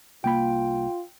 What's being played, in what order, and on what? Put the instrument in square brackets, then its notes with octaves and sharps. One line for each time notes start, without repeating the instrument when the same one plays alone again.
[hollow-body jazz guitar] C2 A#3 B5 [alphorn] F4 [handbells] G5